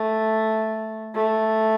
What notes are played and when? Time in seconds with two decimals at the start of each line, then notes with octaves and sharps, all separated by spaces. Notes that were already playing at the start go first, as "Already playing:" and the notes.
Already playing: A3
1.15 A3